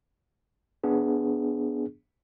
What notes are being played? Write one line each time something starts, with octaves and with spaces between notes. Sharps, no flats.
B3 D4 G#4